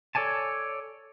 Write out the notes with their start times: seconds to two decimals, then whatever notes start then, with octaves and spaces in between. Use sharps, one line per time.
0.15 A4 C#5 D5 G#5 A5